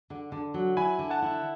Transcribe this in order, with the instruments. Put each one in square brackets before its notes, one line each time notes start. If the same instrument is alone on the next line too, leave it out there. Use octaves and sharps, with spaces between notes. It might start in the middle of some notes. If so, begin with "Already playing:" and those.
[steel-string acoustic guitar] D3
D3
F#3
[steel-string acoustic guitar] E4 [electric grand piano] G#5 B5
[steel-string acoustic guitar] D3
[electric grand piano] F#5 A5
[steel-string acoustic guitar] E4